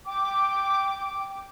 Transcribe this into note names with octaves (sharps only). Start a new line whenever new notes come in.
G5 D6